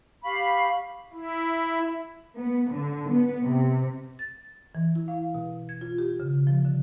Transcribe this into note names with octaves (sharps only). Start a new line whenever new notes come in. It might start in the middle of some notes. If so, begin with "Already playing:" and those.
G4 F5 B5 C#6
E4
B3
D3
B3
C3
A6
E3
E4
F5
B2
G#6
F4
G4
C#3
F3
D3